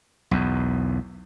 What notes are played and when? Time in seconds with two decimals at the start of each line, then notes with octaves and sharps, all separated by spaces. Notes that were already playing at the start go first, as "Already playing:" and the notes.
0.31 B1 E2